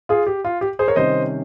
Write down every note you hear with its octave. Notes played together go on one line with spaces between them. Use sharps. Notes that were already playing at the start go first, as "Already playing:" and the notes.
F4 G#4
G4
F4
G4
G#4 C5
A#4 C#5
C3 D#3 G3 C#4 C5 D#5